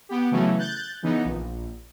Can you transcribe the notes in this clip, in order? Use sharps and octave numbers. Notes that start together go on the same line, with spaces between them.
B3 G4
C#3 E3 F#3 A3 B3 C#4
F#6 G6 A6
C#3 E3 B3 D#4
A#1